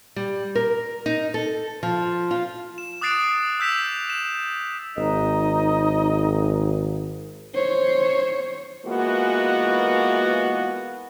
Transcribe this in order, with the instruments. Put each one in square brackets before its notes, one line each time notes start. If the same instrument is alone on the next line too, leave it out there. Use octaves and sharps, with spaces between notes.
[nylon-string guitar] G3
A#4
D#4
A4
F3
F4
[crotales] E7
D6 D#6 F#6 A6 C7 D7
E6 G6 B6 E7 F7
E7
[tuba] G#1 [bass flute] D#4 [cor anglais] D#5
[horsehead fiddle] C5 C#5
[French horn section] E3 G#3 A#3 B3 F4 F#4